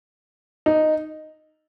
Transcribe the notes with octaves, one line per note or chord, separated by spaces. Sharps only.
D#4